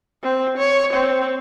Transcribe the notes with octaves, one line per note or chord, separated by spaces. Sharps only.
C4
C#5
C4